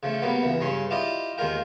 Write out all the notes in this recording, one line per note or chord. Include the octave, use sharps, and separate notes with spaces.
C#3 F3 A3
F#3 G3 A#3 B3
C#2 E3
G2 C#3 C#4 C6
E4 F4 G4 D5 D#5
D#2 D#3 G#3 F4 A#4 G5